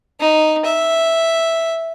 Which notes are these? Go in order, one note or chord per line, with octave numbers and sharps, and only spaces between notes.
D#4
E5